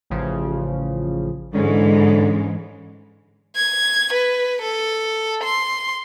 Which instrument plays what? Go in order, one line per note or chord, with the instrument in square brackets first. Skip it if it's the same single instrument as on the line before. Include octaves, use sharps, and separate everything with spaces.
[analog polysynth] A1 C#3 F3
[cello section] G#2 E3 G#3 [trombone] D3 [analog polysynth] C#4
[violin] G#6
B4
A4
C6